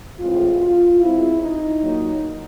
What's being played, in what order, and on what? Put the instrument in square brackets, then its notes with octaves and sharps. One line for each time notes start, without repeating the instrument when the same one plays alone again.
[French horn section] A2 E3 G#3 C4 F4
F4
B2 G#3 C4 E4
D#4
A#2 F#3 A#3